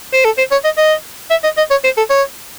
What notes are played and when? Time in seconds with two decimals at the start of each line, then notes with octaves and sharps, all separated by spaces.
0.14 C5
0.25 A4
0.38 C5
0.52 C#5
0.64 D#5
0.78 D#5
1.30 E5
1.44 D#5
1.57 D#5
1.71 C#5
1.84 C5
1.97 A4
2.10 C#5